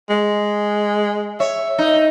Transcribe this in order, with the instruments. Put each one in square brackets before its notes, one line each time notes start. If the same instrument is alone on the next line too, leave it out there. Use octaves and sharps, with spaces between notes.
[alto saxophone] G#3
[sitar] C#5 [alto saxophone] E5
[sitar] D#4